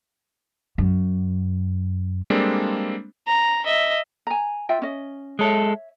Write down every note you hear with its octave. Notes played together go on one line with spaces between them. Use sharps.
F#2
G3 G#3 A#3 C4 D4 A4
A#5
D#5 E5
G#5 A#5
F4 E5 G5
C#4 D#5
G#3 A4 C#5 E5